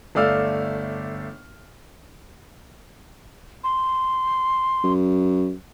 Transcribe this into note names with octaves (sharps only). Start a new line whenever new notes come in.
G1 A3 D5 F5 E6 F6
C6
F#2